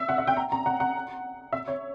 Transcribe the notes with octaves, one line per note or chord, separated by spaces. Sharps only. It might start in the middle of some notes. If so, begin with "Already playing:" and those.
Already playing: E5
F#5
E5
G5
A#5
A#5
F#5
F#5
E5
C#5